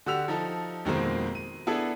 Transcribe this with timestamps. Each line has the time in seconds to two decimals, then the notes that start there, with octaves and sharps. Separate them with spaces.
0.06 D3 F#4 G4 E6 F7
0.28 F3 D#4 A4
0.85 F2 B2 D#3 G#3 A#3 C4
1.35 D#7
1.67 B3 D4 E4 G#4 A4 B4